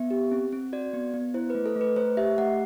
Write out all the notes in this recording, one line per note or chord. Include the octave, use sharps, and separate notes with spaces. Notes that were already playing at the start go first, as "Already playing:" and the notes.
Already playing: B3 E5
G4
C4
C4
F#4 D5
B3
B3
E4 C5
A3 B4
A4
A3
B4
A3 C5
G4 E5
A3 F#5